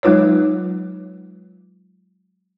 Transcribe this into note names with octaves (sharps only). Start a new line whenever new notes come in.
F#3 G#3 D#4 F4 B4 C#5